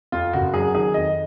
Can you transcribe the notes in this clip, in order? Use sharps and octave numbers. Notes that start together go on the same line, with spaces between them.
F2 F4
F#1 F#4
F#3 G#4
D#3 G#4
F2 D#5